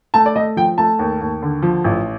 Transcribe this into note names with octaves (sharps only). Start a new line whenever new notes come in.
A3 A5
D5
A3 D#5
F3 G5
A3 A5
D#2
D#2
D3
F3
A1